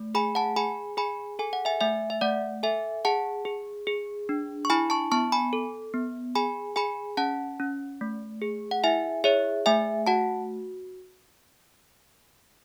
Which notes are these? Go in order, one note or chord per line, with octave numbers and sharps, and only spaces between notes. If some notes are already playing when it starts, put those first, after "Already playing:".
Already playing: A3
G#4 G#5 B5
F#5 A5
G#4 G#5 B5
G#4 G#5 B5
A4 G#5
F#5
E5 G#5
A3 E5 G#5
E5
A3 D5 F#5
A4 E5 G#5
G#4 F#5 A5
G#4
G#4
D4
C#6
E4 G#5 B5
A5 C#6
B3 A5 C#6
G#5 B5
A4
B3
G#4 G#5 B5
G#4 G#5 B5
C#4 F#5 A5
C#4
A3
G#4
F#5
E4 E5 G#5
G#4 C#5 E5
A3 E5 G#5
F#4 F#5 A5